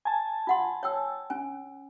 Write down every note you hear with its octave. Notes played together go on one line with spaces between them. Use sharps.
G#5 A5
F4 F#5 C6
C#5 G5 E6
C#4 G#5